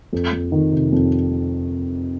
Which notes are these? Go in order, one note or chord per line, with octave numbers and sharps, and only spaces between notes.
F2
F2
D#3
C3
F2